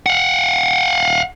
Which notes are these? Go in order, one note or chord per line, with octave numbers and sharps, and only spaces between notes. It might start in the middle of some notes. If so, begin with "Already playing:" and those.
F5 F#5